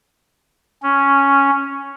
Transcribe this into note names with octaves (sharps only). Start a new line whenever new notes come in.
C#4